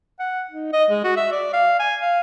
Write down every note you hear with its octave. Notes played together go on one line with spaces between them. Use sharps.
F#5
D#4
D#5
G#3
F#4
E5
D5
F5
G#5
F5